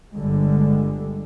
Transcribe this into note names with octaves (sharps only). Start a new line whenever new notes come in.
G1 D3 G3 G#3